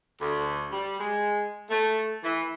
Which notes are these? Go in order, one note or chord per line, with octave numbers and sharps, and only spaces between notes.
D2
G3
G#3
A3
E3